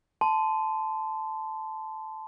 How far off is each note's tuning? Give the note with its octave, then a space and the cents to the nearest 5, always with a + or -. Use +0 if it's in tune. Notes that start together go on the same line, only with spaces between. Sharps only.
A5 -10 C6 -20